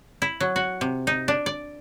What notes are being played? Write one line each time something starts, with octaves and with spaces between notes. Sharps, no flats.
E4
F#3
F#4
C3
D#4
D4
D5